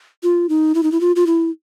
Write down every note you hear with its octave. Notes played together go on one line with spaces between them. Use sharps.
F4
D#4
E4
D#4
E4
F4
F4
E4